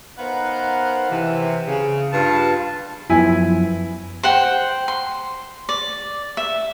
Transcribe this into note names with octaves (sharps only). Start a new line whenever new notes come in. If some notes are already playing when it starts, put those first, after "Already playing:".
B3 D#4 A#4 C5 F5 F#5
C3 E3
C#3
G2 F4 A5
F#2 F3 B3 E4 G#5
C5 F#5 G5
C6
D5
E5